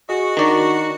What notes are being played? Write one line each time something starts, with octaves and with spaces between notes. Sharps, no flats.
F#4 G#4 D#5
D#3 D4 D5 A#5